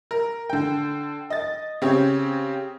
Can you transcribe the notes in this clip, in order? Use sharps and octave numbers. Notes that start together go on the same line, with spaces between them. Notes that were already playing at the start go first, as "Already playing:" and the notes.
A#4
D3 G5
D#5 A6
C#3 C4 G4 C#5